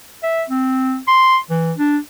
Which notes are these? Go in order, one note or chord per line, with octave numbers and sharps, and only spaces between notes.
E5
C4
C6
E3
D4